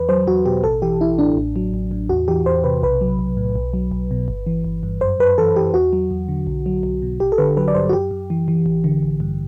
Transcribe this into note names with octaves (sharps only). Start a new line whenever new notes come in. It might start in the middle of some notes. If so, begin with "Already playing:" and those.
Already playing: E2 B4
F#3 C5
E2 F#4
B2 G4
A1 A4
E3 G4
A1 E4
A2 D4
A1
F#3
A1
A2
E2 F#4
E3 G4
E2 C5
C3 B4
B1 B4
F#3
B1
A2
B1
F#3
B1
B2
G1
E3
G1
G2
F#2 C5
F#2 B4
E3 A4
E3 G4
E2 F#4
F#3
E2
D3
B1
F#3
B1
B2
A1 G4
A4
D3 B4
F#3 B4
D5
G2 C5
F#4
F#2 G4
F#2
E3
E3
A1
D3
A1
G2